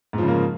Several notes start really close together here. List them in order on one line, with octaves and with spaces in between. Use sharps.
G#2 F3 C#3 A#3